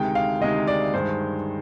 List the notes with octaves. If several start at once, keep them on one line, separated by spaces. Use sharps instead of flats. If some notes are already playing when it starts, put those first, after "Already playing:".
Already playing: D2 C3 D#3 G#3 G5
F5
D2 C3 D#3 G#3 D#5
D5
G2 D#3 G#3 C5